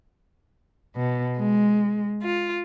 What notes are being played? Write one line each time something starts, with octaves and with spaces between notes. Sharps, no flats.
B2
G#3
F4